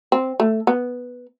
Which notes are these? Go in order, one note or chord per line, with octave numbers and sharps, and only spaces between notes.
C4
A3
B3